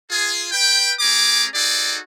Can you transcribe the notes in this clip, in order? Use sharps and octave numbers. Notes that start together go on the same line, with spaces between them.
F4 G#4
B4 G5
A3 C#4 G#4 A#5 D6
D#4 F#4 G#4 A4 D5